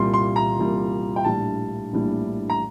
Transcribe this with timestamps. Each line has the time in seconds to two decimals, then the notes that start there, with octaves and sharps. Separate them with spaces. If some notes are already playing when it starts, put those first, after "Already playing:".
Already playing: C2 A#2 G3 C6
0.14 C6
0.36 A#5
0.58 C2 A#2 G3
1.16 G5
1.24 A#1 A2 G3 D4 A5
1.93 A#1 A2 G3 D4
2.50 A#5